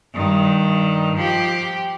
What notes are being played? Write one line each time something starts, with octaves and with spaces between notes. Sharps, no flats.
G2 D#3
F3 G4